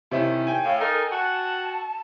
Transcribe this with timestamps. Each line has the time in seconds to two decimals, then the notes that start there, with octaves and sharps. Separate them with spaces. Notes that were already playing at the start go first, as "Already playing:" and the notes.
0.11 C3 D#3 C#4 E4
0.47 G5 G#5
0.64 A2 F5
0.80 D#4 A4 A#4
1.12 F#4 A5